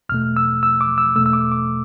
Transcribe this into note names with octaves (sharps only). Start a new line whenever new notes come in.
E2 B2 A3 F6
E6
E6
D6
E6
E2 B2 A3 E6
E6
D6
D6